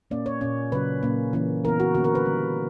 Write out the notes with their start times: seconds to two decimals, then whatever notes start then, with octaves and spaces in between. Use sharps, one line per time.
0.10 A#2 A#3 C#4 D5
0.26 C#5
0.41 A#2 A#3 C#4
0.72 C#3 F#3 C#4 B4
1.03 A#2 A#3 C#4
1.33 E3 A#3 C#4
1.64 E3 B3 A#4
1.80 F#4
1.95 D3 A#3 C#4 F#4
2.04 A#4
2.15 B4
2.25 D3 G3 C#4